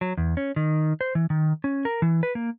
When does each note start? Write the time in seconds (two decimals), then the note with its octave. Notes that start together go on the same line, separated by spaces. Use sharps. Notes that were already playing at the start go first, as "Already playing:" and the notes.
0.01 F#3
0.17 E2
0.37 C#4
0.56 D#3
1.01 C5
1.15 E3
1.30 D#3
1.64 C#4
1.85 A#4
2.02 E3
2.23 B4
2.35 A#3